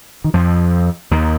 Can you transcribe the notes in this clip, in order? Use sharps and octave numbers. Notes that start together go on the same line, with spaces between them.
D#3
F2 F3
D#2 D#3